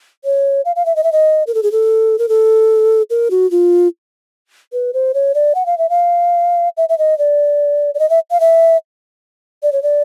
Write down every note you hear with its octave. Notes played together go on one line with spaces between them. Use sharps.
C#5
F5
F5
E5
D#5
E5
D#5
A#4
A4
G#4
A4
A#4
A4
A#4
F#4
F4
B4
C5
C#5
D5
F#5
F5
E5
F5
E5
E5
D#5
D5
D5
D#5
E5
F5
E5
D5
C#5
D5